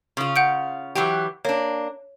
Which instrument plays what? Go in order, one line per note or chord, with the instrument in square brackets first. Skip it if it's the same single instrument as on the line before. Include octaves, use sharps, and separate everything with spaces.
[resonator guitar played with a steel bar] C#3 F4
[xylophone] F#5 G6 D7
[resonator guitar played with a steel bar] E3 F#3 G4
[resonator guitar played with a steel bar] A#3 D4 [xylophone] C#5